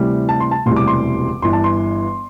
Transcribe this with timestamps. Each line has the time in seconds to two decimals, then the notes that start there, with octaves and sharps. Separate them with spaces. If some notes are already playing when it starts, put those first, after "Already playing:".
Already playing: D2 C3 E3 G3
0.29 A5
0.40 C6
0.51 A5
0.66 E1 D2 C3 E3 G3 C6
0.76 D6
0.88 C6
1.42 G1 G2 E3 C6
1.53 A5
1.64 C6